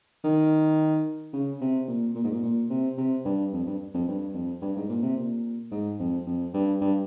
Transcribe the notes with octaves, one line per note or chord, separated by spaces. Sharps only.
D#3
C#3
C3
A#2
A#2
G#2
A#2
A#2
C3
C3
G2
F2
G2
F2
G2
F2
G2
G#2
A#2
C3
A#2
G#2
F2
F2
G2
G2